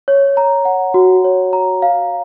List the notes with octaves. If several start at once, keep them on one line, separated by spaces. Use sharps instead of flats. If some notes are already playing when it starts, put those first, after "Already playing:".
C#5
A#5
F#5
F#4
C#5
A#5
F5